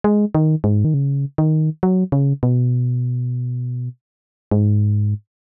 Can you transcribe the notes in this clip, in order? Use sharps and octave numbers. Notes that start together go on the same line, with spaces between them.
G#3
D#3
G#2
D#3
C#3
D#3
F#3
C#3
B2
G#2